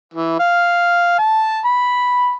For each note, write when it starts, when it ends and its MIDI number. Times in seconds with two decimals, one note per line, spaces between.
0.14 0.38 52
0.39 1.17 77
1.18 1.60 81
1.65 2.35 83